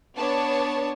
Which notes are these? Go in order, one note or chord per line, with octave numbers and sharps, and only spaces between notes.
B3 D4 C#5 A5